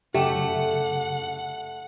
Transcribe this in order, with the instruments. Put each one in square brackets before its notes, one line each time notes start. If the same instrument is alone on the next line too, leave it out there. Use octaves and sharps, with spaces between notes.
[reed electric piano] F#2 C#3 [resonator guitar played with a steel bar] A3 [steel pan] G4 [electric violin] F#5